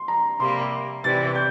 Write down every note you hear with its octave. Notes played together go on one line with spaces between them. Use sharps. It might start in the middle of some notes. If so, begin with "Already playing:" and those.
Already playing: C6
A#5
C3 G3 A#3 C6
C3 E3 G3 A6
G6